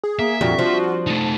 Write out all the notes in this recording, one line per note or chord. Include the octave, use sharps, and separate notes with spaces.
G#4
A#3 E5
F2 A#2 G3 D4 F#4
F3
A3 D#4 A5